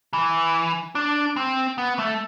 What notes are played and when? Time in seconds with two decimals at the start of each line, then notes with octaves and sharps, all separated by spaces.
0.13 E3
0.95 D4
1.36 C4
1.78 B3
1.99 A3